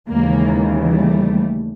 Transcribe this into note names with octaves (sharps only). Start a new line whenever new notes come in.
D#2 C#3 E3 G#3 A#3
G3 A3